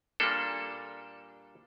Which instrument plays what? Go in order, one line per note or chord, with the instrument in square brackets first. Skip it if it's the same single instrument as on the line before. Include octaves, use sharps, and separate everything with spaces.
[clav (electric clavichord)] A#2 G3 A#3 D4 A4